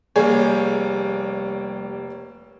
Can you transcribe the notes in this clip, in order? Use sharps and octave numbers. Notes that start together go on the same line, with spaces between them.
F1 G3 A#3 G#4 C#5